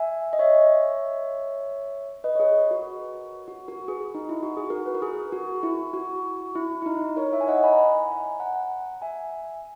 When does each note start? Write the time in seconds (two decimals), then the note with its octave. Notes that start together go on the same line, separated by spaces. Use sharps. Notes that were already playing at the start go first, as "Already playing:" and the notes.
Already playing: E5 G#5
0.33 D#5
0.39 C#5 E5
2.24 B4 D#5
2.35 C#5
2.40 G#4 B4
2.61 B4
2.71 F#4 A#4
3.48 F#4
3.68 F#4 A#4
3.88 G#4 B4
4.14 D#4
4.29 E4
4.43 F#4
4.57 G#4
4.70 F#4 A#4
4.86 B4
4.94 A#4
5.02 G#4
5.33 F#4
5.63 E4
5.93 F#4
6.56 E4
6.82 E4
6.86 D#4
7.16 A#4 C#5
7.33 C#5 E5
7.41 G#5
7.48 D#5 F#5
7.63 G#5 B5
7.73 A#5
7.78 G#5 B5
8.40 F#5 A#5
9.02 E5 G#5